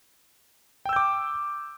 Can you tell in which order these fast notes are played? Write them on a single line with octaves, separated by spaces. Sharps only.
G5 E6 G6 D6